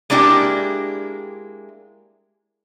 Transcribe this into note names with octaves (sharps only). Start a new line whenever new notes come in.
G#3 A#3 D4 E4 G4